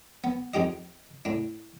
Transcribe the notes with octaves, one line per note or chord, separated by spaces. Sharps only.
B3
F2 D#4 G4 D#5
A2 D4